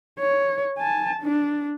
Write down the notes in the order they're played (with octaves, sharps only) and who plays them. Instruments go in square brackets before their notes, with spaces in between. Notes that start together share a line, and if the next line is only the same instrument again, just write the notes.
[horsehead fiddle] C#5
G#5 A5
D4